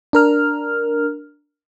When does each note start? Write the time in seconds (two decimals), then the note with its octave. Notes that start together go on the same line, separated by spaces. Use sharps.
0.13 D4 A#4 F6